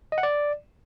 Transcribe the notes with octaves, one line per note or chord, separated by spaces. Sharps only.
D#5
F#5
D5